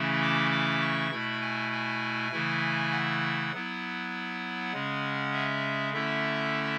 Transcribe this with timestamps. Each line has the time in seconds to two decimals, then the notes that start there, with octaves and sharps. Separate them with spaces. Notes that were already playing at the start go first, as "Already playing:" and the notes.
Already playing: C#3 E3 A3 C#4 E4
0.21 D6
0.51 D6
0.81 C#6
1.12 B2 A3 E4 B5
1.41 G#5
1.72 G#5
2.32 C#3 E3 A3 E4
2.92 F#5
3.53 F#3 B3 E4
4.73 C#3 G#3 C#4
5.33 E5
5.93 D3 A3 C#4 E4 E5